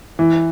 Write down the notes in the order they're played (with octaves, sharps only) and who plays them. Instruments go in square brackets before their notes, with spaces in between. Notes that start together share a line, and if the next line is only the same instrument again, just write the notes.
[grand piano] E3